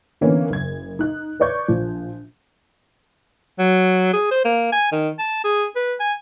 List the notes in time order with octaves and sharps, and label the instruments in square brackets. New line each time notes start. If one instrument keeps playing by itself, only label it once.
[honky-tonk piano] D3 E3 A#3 B3 C#4
F#1 G#6
D#4 F#6
B4 C#5 D5 C#6 G6 G#6
A#1 F3
[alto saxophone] F#3
G#4
C5
A#3
G#5
D#3
A5
G#4
B4
G#5